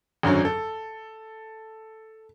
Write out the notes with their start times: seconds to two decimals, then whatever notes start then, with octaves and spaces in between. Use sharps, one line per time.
0.23 G#1 F#2 D3 F#3
0.45 A4